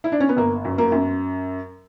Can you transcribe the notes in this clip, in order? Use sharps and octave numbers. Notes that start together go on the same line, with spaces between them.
E4
D4
C#4
B3
G1 A#3
F#2
A#3
F#2